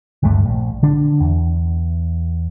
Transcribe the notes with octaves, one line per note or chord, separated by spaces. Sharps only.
G#1 D2 G2 A3
A#1
D3 D4
E2